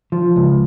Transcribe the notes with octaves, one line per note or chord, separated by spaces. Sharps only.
F3
C#2